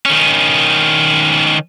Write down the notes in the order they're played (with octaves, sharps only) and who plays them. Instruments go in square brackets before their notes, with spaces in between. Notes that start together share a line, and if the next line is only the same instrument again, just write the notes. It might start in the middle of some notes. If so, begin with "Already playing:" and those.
[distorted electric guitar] D#3 C#4